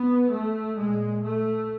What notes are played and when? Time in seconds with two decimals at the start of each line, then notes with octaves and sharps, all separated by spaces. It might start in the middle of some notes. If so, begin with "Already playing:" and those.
Already playing: B3
0.32 A3
0.78 A#2 G#3
1.24 A3